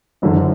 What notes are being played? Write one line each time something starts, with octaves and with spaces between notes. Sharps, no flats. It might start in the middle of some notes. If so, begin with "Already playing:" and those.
F#1 F#2 D3